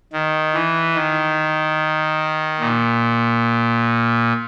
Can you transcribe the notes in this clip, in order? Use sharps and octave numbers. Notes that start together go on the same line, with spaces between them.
D#3
E3
D#3
A#2